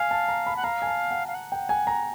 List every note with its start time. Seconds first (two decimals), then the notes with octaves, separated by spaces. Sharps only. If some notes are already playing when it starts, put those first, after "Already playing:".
Already playing: F5 G#5
0.11 A5
0.28 A#5
0.47 B5
0.56 F#5
0.64 F5 A#5
0.82 G#5
0.87 A5
1.11 F#5
1.28 F5
1.35 F#5
1.52 G5
1.69 G#5
1.87 A#5